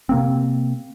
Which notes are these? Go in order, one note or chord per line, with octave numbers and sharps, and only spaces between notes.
C3 A#3 C4